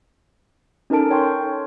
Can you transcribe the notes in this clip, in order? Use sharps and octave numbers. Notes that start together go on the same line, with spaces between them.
C#4 D#4 A4 A#4 A5 D7
C#5 G5 C6 C#6